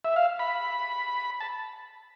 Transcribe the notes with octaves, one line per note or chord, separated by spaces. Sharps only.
E5
F5
B5
A5